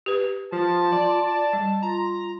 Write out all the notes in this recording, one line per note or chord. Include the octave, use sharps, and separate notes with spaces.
G4 B4
F3 F4 A5
D5
G3
F4 A#5